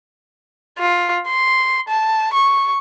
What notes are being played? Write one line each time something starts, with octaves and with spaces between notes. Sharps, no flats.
F4
C6
A5
C#6